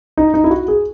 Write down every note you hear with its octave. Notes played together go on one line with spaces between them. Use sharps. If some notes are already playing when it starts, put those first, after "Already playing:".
D#4
D#4
E4
F#4
G#4